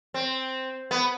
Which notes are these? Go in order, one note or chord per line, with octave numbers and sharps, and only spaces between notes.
C4
B3